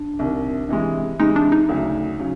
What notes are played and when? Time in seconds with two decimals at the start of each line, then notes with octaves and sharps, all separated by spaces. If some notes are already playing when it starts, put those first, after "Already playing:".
Already playing: D4
0.19 C2 C3 D#3
0.69 C3 E3 G#3
1.20 C3 E3 G#3 D#4
1.36 D4
1.52 D#4
1.69 D2 C#3 F#3
2.19 C#3 F#3